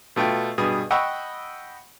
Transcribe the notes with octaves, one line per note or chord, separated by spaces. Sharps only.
B2 A3 F4 G5
G2 B2 G#4
D#5 F#5 G5 B5 C#6 E6